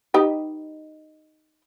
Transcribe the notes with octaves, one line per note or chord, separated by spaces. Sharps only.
D#4 G4 B4